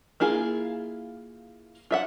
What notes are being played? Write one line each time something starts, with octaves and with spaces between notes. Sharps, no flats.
A#3 E4 F4 G#4
F4 E5 F#5